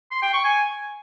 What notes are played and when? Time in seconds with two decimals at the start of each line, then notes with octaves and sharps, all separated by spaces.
0.11 C6
0.22 G5
0.33 C#6
0.44 G#5